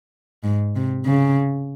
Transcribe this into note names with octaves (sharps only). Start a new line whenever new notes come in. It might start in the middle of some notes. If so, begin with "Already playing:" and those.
G#2
C3
C#3